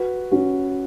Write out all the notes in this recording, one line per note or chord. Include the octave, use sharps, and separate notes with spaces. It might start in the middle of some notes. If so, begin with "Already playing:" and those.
Already playing: F#4 B4
C#4 F#4